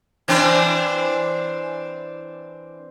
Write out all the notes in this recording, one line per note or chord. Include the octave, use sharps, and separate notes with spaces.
E3 C4 D4